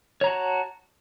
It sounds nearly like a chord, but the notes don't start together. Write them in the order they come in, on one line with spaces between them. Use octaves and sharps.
C#5 A#5 F#4 A5